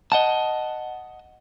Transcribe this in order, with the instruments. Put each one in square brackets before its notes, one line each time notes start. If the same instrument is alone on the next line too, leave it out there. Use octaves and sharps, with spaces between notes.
[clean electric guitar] D#5 F#5 A5